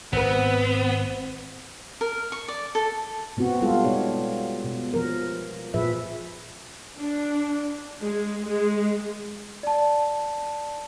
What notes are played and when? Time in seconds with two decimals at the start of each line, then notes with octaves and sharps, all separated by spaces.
0.13 G#1 D#3 B3 C4 B4
2.01 A#4
2.32 C#6
2.48 D5
2.75 A4
3.37 B2 B3 C4 F#4
3.62 G3 G#3 F4 A4
3.85 B2 D#4 C#5
4.64 B2
4.94 F3 A#4
5.74 A#2 F3 G#4 B4 E5
6.99 D4
8.02 G#3
8.49 G#3
9.63 D5 A5